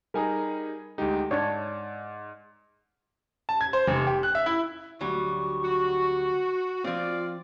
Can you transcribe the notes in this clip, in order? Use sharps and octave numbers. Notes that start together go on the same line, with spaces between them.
G3 D#4 G#4 A#4 G#5 A#5
D2 G#3 D#4 G4
G#2 D4 C#5 D5
A5
G#6
C5
F1
G4
F#6
E5
E4
D2 F#3 G3 C#6
F#4
F3 C4 F4 D5